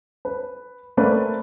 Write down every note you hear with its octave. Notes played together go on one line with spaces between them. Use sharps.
B4
A3 A#3 C4 B4 D5